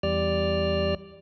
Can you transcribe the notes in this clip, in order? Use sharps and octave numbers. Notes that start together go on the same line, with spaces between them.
E2 G3 D5 F6